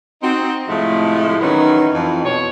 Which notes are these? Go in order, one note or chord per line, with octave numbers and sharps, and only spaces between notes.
C4 D#4 F#4
A2 C3 F3 G#3 A3
D#3 E3 F#3 B3 C#4 D#4
F2 E3
B2 C#5